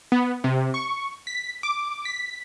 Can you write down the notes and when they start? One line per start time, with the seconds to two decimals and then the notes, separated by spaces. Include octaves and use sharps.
0.12 B3
0.44 C3
0.74 C#6
1.27 B6
1.63 D6
2.05 B6